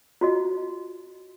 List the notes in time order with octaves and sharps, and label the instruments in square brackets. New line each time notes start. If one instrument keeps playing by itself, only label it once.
[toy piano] F4 F#4 D#5